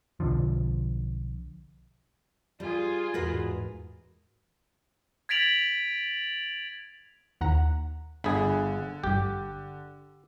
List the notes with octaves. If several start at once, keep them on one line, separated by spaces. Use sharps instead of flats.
B1 D3 F3
G3 F4 G#4
E2 G#2 F#4 A#4 B4
G#6 A6 B6 D7 F7 F#7
D#2 F#5 A#5
G1 D3 G#4 B5
G#1 G2 G4